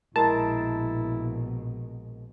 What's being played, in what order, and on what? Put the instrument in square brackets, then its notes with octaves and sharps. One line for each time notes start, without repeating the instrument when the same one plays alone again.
[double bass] A#1 B2 [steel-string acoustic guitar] G#3 A#4 [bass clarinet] E4 [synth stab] A5